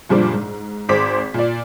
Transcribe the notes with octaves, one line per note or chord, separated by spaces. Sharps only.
F#1 A#2 F3 G3 D4 D6
G#2
G#1 C4 G#4 C5 D6 B6
A#2 D5